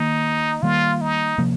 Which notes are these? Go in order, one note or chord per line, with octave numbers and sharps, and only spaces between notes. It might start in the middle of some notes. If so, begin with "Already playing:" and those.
Already playing: D#3 A#3 D#4
D#3 G3 A#3 F4
D#4
C3 F3 A#3